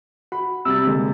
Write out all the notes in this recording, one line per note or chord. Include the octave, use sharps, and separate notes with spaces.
F#4 B5
C3 G3 E6 A6
D3 G#3 A#3